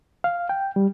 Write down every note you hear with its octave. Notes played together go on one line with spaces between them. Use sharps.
F5
G5
G3